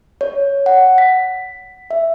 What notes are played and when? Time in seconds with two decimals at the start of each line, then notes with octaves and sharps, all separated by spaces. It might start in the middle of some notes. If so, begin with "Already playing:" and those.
0.21 C#5
0.66 F#5
0.98 B6
1.91 E5